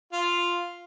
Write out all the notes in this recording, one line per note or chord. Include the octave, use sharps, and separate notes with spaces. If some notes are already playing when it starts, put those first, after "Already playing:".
F4